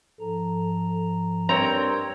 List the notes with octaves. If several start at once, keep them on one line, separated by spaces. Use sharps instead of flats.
G#2 F3 A4 A#5
G2 C4 A#4 C#5 A#5 E6 G#6